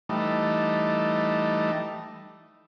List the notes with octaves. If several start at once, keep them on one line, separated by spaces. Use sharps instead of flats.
E3 G3 A3 D#4